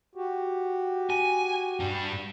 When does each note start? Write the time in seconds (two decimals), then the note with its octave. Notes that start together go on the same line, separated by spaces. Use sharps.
0.15 F#4 G4
1.10 G#5
1.80 G2 D4